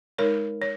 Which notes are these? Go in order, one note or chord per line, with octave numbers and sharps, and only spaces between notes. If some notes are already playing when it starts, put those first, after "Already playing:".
G#3 D#4 A#4 C#5
C#5